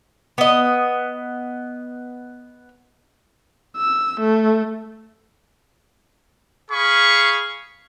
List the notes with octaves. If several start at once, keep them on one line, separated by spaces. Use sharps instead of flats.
B3 D#5
E6
A3
G#4 F5 B5 C#6